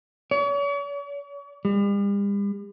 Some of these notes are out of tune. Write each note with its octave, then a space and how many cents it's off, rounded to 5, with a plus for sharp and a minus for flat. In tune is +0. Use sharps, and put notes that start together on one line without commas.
C#5 +40
G3 +45